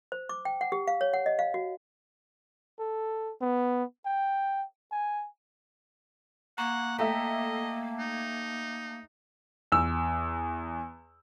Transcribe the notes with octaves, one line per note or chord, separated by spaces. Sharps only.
C5
D6
G5
F#5
G4
F5
C#5
F#5
D#5
F5
F#4
A4
B3
G5
G#5
A#3 F#5 A#5 C#6
A3 A4 D#5 E5 G5 A#5 B6
D#4
E2 E6